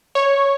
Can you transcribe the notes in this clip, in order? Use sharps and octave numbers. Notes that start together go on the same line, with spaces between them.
C#5